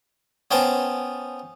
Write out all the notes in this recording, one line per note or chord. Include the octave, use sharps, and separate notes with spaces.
B3 C#4 C5 G5 A5